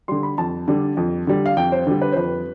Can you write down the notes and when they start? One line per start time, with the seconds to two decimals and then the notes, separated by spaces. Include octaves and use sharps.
0.08 D3 G3 C6
0.23 B5
0.38 F2 A5
0.68 D3 G3
0.97 F2
1.27 D3 G3
1.46 F5
1.57 F2 G5
1.72 C5
1.87 D3 G3
2.02 B4
2.12 C5
2.16 F2 B4